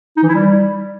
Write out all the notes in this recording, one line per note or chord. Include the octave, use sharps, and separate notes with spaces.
D#4
E3
E4
G3